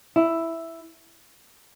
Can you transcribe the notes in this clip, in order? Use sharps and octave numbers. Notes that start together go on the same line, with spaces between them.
E4